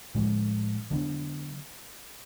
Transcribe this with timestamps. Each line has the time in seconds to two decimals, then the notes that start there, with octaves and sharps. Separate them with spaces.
0.15 A2 F3 G#3
0.90 D3 F#3 B3 D4